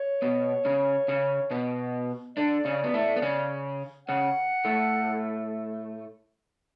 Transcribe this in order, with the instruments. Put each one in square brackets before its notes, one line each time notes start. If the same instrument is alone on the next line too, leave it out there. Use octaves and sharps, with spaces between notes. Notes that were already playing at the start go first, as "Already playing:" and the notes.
Already playing: [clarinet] C#5
[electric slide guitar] B2 B3
C#3 C#4
C#3 C#4
B2 B3
[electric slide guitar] D3 D4 [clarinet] D5
[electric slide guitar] C#3 C#4
B3
A2 A3
B3
C#3 C#4
[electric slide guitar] C#3 C#4 [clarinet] F#5
[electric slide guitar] A2 A3